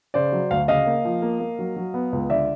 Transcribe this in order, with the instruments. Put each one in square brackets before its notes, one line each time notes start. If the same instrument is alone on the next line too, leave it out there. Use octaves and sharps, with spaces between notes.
[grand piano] C#3 C5 D5
F#3
D2 F5
C#3 D#5 F5
A#3
F3
A#3
A#3
F#3
F#3
B3
C#2
D3 D5 E5